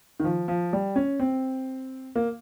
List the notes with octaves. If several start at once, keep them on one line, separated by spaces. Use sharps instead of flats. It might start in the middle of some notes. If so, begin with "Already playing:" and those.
D#3
F3
F3
G3
C#4
C4
A#3